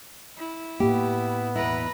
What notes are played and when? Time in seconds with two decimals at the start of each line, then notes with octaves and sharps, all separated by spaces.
0.37 E4
0.80 A2 A#3 B3 G4
1.55 E2 B2 E4 B4 A#5